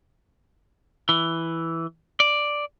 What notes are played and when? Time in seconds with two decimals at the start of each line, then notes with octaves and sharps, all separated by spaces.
1.09 E3
2.20 D5